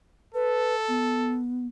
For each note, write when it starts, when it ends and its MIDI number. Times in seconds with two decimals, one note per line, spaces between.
0.34 1.39 69
0.34 0.75 71
0.88 1.67 59